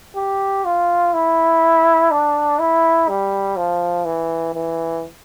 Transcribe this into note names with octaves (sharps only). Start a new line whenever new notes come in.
G4
F4
E4
D4
E4
G3
F3
E3
E3